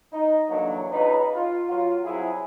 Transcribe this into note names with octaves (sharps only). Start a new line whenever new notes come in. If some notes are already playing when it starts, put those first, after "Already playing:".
D#4
G2 D3 E3 F#3 A#3 D4
C#2 D#4 B4
F4
F#3 F4
C2 C3 F#3 E4 G#4